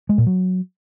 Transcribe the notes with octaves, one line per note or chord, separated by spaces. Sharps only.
G#3
A#2
F#3